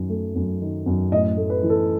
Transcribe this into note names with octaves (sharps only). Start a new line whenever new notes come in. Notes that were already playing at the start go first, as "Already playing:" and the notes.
Already playing: F#2 D#3
A3
F#2
D#3
F#2
A2 D#5
A3
B4
E3
A4